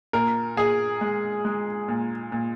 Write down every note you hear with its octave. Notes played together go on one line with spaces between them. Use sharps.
A#2 A#4
A#2 G#4
G#3
G#3
A#2
A#2